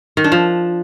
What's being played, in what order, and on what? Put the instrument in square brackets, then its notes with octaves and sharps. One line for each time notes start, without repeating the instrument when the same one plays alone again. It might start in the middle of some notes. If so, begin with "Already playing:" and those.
[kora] D#3
D4
F3